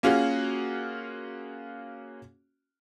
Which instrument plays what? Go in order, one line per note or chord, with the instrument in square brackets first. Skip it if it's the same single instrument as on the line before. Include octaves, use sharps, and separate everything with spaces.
[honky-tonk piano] A#3 C#4 F4 F#4 G#4